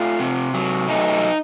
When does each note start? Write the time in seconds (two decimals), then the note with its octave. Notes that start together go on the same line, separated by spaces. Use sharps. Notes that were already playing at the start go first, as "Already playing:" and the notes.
Already playing: A3 F4
0.20 C3
0.54 F#3
0.88 A3 D#4